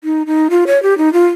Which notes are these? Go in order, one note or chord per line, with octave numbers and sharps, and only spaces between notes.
D#4
D#4
F4
C#5
G4
D#4
F4